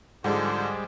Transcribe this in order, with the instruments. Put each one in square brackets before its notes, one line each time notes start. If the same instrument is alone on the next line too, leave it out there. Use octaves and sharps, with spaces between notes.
[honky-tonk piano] G#2 F3 G#4 [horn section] D3 C5 [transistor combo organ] G3 G#3